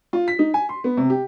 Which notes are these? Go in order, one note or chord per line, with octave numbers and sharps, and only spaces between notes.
F4
B6
D#4
G#5
C6
B3
C3
G4